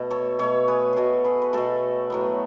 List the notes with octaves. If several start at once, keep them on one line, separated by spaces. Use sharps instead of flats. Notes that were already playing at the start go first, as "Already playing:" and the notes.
Already playing: B2 A3
A4 C#5
B2 A3 A4 C#5
G#4 B4
B2 A3 F#4 G#4 A4
G#4 B4
B4
B2 A3 F#4 A4
A2 F#3 B3